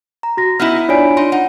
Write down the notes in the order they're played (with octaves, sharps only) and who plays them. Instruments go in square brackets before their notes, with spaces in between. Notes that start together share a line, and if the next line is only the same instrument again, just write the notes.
[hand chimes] A#5
[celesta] F#4 A#6
[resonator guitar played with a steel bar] B3 D#4 E4 [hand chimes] F6
[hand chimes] D4 F4 D7 [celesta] C#5 D5 G#5
[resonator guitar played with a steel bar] D#4 [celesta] C6
[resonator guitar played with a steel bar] D#4 [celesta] F#5